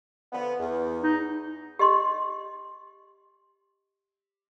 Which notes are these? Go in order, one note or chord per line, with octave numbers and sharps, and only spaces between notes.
D3 F3 B3
E2
D#4
G4 D#5 C6